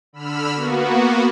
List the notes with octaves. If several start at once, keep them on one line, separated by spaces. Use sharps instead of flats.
D3 B5 E6 F6
A#3 B3 F#4